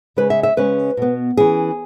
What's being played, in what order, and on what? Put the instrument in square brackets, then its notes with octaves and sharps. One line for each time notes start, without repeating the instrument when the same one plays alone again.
[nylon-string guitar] C#3 G#3 C#4 B4
E5
E5
C#3 G#3 C#4 B4
B2 B3
E3 C#4 G#4